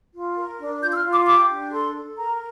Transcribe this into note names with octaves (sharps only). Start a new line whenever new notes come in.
F4
A#4
D4
F4 G6
E6
F6
F4
D6
G4 D6
D4
A4 C6
A4
A#4 A#5